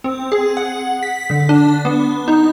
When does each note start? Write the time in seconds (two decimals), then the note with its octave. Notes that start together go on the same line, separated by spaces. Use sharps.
0.04 C4
0.32 G#4
0.57 F#5
1.03 B6
1.30 D3
1.49 D4
1.85 B3
2.28 D#4